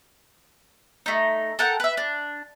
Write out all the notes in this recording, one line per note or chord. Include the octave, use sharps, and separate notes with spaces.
A3 D#4
A4 A#4 F#5 G5
B4 E5
D4